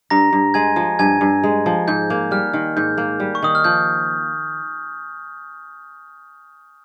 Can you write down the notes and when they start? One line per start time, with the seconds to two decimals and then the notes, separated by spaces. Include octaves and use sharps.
0.10 G2 A#5 A#6
0.33 G2
0.54 G#3 G#5 G#6
0.76 F3
0.99 G2 G#5 G#6
1.21 G2
1.43 G#3
1.66 F3
1.88 G#2 G6
2.10 A#3
2.31 G3 F6
2.53 D#3
2.77 G#2 G6
2.98 A#3
3.20 G3
3.35 C#6
3.42 D#3 D#6
3.55 F6
3.64 F3 G6